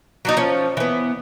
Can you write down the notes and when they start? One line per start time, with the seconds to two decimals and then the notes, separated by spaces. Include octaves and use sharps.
0.25 F#3 D4 D#4
0.37 F3 C#4 C#5
0.77 E3 B3